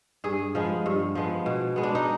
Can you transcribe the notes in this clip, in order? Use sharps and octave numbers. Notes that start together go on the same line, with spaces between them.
G2 G#4
F3 G#3 B3
G2
F3 G#3 B3
B2
G#3 B3
D4
D#4